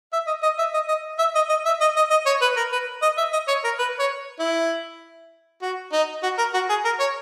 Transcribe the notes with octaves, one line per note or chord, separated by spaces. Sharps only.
E5
D#5
D#5
E5
D#5
D#5
E5
D#5
D#5
E5
D#5
D#5
D#5
C#5
B4
A#4
B4
D#5
E5
D#5
C#5
A#4
B4
C#5
E4
F#4
D#4
F#4
A#4
F#4
G#4
A#4
C#5